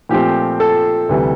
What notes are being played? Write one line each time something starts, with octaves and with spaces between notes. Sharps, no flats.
A#2 F3 A3 C4 G4
A4
D2 C3 E3 G3